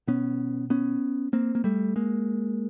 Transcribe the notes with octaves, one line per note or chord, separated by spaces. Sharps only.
B2 B3 C#4
B3 C#4
A#3 C4
A#3
G3 A3
G#3 A#3